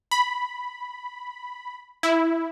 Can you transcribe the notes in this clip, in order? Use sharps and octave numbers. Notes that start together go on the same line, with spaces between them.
B5
E4